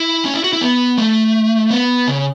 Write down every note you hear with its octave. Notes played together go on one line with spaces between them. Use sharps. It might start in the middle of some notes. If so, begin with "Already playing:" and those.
Already playing: E4
C#4
E4
F#4
E4
B3
A3
B3
C#3